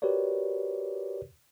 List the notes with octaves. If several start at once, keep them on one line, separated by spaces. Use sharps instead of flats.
F#4 G4 A#4 B4 C#5 D5